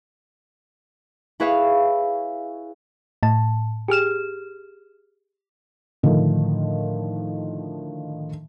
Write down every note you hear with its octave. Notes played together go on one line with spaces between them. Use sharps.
E4 G#4 B4 C#5 E5 F5
A2 A5
G4 G#4 F6 E7
A2 D3 D#3 F3